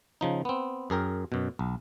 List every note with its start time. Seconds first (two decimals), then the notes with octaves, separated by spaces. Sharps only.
0.21 C#3 F3 D#4
0.45 B3 C4
0.90 F#2 G#4 A#4 G5
1.32 F#2 B2
1.59 B1